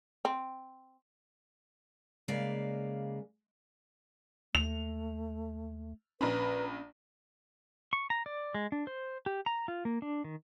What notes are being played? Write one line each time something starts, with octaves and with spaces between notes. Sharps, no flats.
C4
C#3 G#3 A#3 D5 F5
D#2 A3 F7
A#1 C#4 B4 A#5 B5
C#6
A#5
D5
G#3
D4
C5
G4
A#5
F4
A#3
D4
D#3